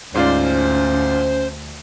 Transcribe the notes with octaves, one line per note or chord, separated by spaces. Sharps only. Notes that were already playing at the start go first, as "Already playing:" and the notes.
D2 G#2 C#4 F4 C5 D5